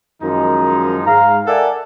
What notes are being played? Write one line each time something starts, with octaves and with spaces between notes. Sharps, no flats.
F#2 D#3 F3 G#3 D#4
G#2 F5 A#5
A4 A#4 D5 E5 F#5 G#5